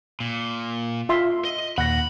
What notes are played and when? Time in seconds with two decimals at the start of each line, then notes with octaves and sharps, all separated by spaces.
0.20 A#2
1.09 F4 E5 C6
1.45 D#5
1.78 D#2 A#2 F#5 B5 A#6